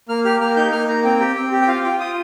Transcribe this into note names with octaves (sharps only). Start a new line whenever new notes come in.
A#3 F6
G4 F6
A#3 F6
D#4 G6
A#3 F6
A#3 A#5
C4 G5
G4
C4
G4
G5
F4 F5
F4 G5
F4 D#6